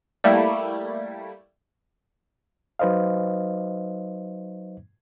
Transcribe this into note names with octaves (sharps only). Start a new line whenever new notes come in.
G3 A3 A#3 E4
F#3 D#4 B4 C5 D#5 F5